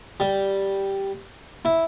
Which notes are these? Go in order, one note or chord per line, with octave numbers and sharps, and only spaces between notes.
G3
E4